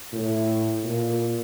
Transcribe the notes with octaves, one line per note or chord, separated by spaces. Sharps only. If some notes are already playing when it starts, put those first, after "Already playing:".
A2
A#2